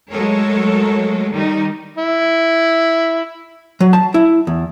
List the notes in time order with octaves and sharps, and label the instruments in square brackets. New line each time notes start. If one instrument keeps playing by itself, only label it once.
[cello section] F#3 G#3 A3 A4 A#4 C#5
D#3 G3 D#4
[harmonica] E4
[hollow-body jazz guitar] F#3
A5
E4
E2